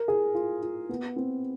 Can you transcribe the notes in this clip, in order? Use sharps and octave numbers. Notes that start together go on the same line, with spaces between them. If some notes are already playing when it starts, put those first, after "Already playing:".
Already playing: A#4
G#4
F4
F4
B3
C4